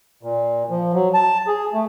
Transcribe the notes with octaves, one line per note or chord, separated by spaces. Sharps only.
A#2
F3
F#3
A5
G#4
A3